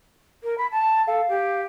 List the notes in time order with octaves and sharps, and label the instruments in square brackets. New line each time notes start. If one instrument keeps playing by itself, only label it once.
[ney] A#4
B5
A5
[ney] A4 [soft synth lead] F5
[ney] G4